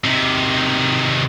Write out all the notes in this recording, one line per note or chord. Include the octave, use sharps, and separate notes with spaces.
C3 D#3